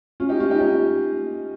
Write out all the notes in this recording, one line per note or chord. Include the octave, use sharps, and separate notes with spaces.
C#4 F4
D#4 G4
C#4 F4
D#4 G4
D#4 G4